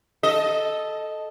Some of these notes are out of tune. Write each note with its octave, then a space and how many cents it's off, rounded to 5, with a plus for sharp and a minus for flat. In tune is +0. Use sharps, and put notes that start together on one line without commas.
A4 -5 D#5 +0